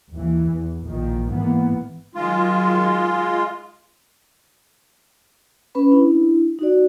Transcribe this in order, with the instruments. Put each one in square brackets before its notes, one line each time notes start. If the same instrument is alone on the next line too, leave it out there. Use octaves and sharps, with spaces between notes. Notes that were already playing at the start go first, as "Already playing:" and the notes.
[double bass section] D#2 E3
E2
A#1 A#2 D#3 F3
G#2 E3 A#3 B3
[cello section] D#3 F#3 [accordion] G#3 F4
[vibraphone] C#4 B4 B5
D4 E4
D#4 F#4 D5